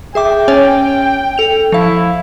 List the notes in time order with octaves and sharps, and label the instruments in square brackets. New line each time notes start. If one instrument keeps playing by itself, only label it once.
[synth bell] G#4 E5 D6 [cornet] G5
[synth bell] C#4 C#5 G#5
A4 F7
[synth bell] F3 F5 [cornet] E4